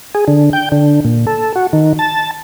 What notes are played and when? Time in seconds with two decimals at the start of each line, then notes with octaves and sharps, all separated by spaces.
0.15 G#4
0.28 D3
0.53 G5
0.72 D3
1.05 A#2
1.27 A4
1.56 F#4
1.73 D#3
1.99 A5